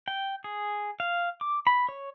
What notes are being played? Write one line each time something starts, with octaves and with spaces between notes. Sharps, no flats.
G5
G#4
F5
D6
B5
C#5